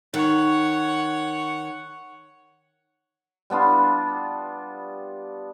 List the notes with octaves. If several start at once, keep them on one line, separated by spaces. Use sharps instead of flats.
D#3 C#5 F#5
G3 B3 D4 F4